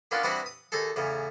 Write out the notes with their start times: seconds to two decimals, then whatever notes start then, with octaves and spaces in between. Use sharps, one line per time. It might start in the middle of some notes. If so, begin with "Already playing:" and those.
0.11 A#3 B3 C#4 D4 F4
0.23 E3 G3 B3 C4 D4 F#4
0.46 D#6
0.72 D#2 D#4 G#4 A4
0.96 E2 A2 C#3